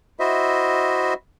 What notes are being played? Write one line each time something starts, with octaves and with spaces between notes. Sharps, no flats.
E4 F#4 C5 D#5 E5